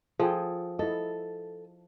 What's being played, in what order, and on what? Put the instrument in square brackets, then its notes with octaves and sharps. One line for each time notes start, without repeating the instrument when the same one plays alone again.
[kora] F3 [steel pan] G#4 A4 G5
[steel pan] E4 D#5 [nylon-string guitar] A4